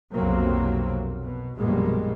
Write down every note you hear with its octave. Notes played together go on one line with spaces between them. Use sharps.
B1 F2 C3 F#3 A#3 C4
B2
A#1 F#2 B2 G3 G#3 A#3